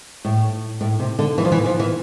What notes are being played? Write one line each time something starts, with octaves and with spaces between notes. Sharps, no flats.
A2
A2
C3
D3
E3
F3
E3
F3
E3